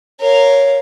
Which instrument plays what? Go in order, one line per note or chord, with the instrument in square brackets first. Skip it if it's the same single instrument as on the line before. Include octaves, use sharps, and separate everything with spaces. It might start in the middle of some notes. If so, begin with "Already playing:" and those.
[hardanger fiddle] A#4 F5 [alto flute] C#5